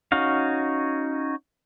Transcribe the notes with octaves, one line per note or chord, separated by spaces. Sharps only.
C#4 D#4 F#4 F5